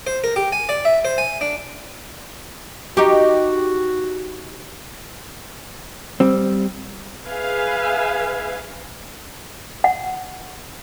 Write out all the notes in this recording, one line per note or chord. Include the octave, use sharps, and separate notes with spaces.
C5
A#4
G4
G#5
D5
E5
C5
G#5
D4
D#4 F#4 G4
G3 C4
G#4 B4 E5 F5 G#5
F#5